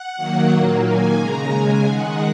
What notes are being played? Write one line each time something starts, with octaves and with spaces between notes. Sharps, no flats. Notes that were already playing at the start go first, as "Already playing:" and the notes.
Already playing: F#5
D#3 F#3 A#3
A#2 F#3 A#3
D#3 A#3 G#5
C#3 G#3 A#5
C#3 G#3 G#5
D#3 G#3 F#5